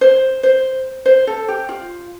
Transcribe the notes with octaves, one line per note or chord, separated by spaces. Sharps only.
C5
C5
C5
A4
G4
F4